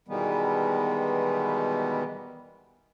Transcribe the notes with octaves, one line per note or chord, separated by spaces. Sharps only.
B2 D#3 E3 G3 G#3 B3